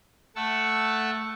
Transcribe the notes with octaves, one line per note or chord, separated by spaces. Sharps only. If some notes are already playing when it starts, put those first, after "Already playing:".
A3 F#5 A5 C#6 E6